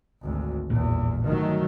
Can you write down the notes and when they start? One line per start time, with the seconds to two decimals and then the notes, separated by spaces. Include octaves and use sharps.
0.21 G#1 D2
0.70 A1 E2 G2 A#2
1.26 G1 D#3 F#3 A3